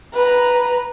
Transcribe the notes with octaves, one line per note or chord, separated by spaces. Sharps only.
B4 A#5